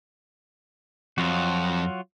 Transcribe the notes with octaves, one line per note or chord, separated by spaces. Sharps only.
F2 F#3 F4 F#4